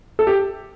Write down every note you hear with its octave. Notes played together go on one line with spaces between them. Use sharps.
A4
G4